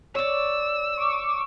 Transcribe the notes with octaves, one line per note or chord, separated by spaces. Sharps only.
C#5 D5 E6
C#6 D6